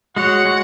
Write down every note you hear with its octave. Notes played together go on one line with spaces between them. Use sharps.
G#3 F#4 C#5 F#5
G#3 F#4